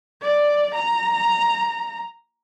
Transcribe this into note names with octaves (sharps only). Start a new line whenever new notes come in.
D5
A#5